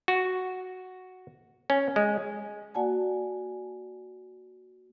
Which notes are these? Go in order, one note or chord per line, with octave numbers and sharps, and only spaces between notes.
F#4
C#4
G#3
A#3 F#4 D5 F#5 G#5 A5